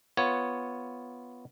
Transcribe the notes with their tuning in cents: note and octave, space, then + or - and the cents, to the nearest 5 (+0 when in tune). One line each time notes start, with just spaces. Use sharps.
B3 +0 F4 -5 C#5 +0